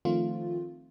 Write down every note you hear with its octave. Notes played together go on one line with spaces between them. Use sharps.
D#3 F3 A3 C4 F4